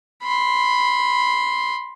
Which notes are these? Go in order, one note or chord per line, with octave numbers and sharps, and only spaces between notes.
B5 C6